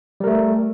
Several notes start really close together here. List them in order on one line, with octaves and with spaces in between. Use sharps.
G3 A#4 A3